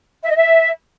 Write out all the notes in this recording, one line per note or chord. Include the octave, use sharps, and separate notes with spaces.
E5
D#5
E5